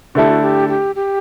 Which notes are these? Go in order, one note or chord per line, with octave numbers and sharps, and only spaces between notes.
D3 A3 E4 G4 A4
F#4
G4
G4
G4